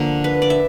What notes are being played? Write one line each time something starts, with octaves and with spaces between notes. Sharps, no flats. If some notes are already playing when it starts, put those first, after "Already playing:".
Already playing: D3 F3 A#3
B4
D5
E5